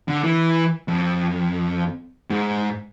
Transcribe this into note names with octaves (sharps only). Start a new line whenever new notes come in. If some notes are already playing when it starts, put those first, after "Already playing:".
D3
E3
F2
G#2